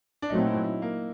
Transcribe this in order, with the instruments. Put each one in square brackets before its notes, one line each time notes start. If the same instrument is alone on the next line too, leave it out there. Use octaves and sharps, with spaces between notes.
[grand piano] D4
[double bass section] A#2 F#3 A3 C4 [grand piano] D#4
[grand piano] E4
E4
A#3